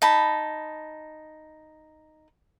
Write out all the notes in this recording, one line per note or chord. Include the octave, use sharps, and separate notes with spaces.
D#4 A5 B5